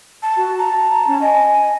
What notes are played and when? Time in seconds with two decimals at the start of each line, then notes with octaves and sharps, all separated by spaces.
0.23 A5
0.37 F#4
0.58 A5 A#5
1.07 C#4
1.22 D#5 G#5